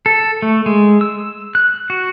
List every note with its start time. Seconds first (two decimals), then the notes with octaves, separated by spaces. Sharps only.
0.06 A4
0.42 A3
0.66 G#3
1.01 E6
1.55 F#6
1.90 F#4